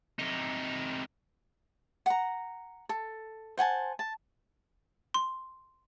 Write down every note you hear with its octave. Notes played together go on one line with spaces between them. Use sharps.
C3 D#4
F#5 A#5
A4
C5 F#5 G#5 A5
A5
C6